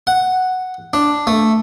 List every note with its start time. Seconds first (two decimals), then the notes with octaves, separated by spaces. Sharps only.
0.07 F#5
0.93 D4
1.27 A3